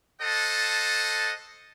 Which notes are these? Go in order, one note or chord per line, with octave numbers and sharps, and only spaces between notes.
A4 C5 D#5 F#5 A5